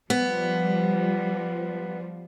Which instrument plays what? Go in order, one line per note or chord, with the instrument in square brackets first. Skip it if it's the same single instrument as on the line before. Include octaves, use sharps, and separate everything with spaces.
[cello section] F3 G3 [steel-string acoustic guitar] B3